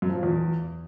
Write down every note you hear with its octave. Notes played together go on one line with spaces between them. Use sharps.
F#2
F3
A#2
E2